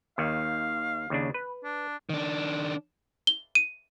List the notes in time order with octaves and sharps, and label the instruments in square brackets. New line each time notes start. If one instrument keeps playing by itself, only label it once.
[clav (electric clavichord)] D#2 D#3 [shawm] F5
[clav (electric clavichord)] D#2 C#3 D4
B4
[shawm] D4
[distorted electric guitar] D#3 D4
[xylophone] G7
D#7